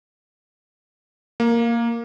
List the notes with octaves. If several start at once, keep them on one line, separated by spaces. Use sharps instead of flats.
A#3